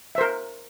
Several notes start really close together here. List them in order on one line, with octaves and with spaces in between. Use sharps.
E5 C5 A#4